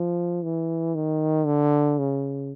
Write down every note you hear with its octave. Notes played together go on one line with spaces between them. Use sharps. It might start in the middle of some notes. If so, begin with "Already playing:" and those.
Already playing: F3
E3
D#3
D3
C#3